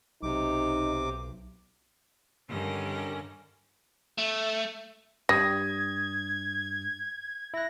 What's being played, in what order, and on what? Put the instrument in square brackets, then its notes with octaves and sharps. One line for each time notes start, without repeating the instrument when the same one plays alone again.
[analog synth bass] B1 [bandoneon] C3 D6 [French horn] D#4
[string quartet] G2 D3 D#3 C#4 A#4 A#6
[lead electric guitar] A3
[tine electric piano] G2 [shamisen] G3 [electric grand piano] D#6 A#6 [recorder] G#6
[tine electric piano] E4 F#6 [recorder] A#6